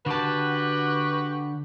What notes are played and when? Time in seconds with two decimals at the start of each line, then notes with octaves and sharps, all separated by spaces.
0.06 D3 F#4 G4 B4 A5